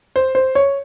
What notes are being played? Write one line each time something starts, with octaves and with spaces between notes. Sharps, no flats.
C5
C5
C#5